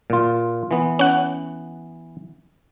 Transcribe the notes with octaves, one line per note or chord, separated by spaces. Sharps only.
A#2 F4
E3 B3
C#4 F#5